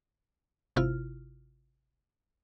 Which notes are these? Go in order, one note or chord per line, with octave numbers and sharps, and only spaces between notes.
G#1 C3 E4 F4 F6